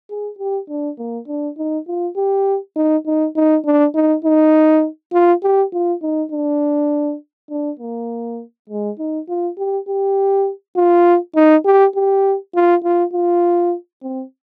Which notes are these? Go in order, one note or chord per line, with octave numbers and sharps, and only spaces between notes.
G#4
G4
D4
A#3
D4
D#4
F4
G4
D#4
D#4
D#4
D4
D#4
D#4
F4
G4
F4
D#4
D4
D4
A#3
G#3
D#4
F4
G4
G4
F4
D#4
G4
G4
F4
F4
F4
C4